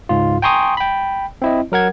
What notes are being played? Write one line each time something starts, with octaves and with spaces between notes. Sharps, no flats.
C#2 G#2 F4
G5 G#5 A#5 C6 C#6 D#6
G5 B5
C4 E4 D#5
F#3 A#4 F#5 G#6